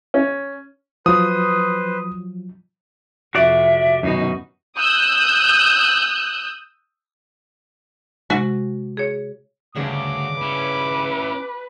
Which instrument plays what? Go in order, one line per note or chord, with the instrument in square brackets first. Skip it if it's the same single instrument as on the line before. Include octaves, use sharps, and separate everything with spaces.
[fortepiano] C#4
[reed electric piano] F3 F#3 [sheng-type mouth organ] B4 C5 [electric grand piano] D#6
[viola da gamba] F2 C3 [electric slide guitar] F#4 D5 [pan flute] E5
[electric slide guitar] F#2 B2 [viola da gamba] D#3 D#4 F#4
[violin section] D#6 E6 F#6 G6
[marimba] C3 G#3 [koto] F#4
[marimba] G#4 C#5
[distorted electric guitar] D2 [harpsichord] G2 C#3 F#4 [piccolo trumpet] D6
[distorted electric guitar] C#4 E4 [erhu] B4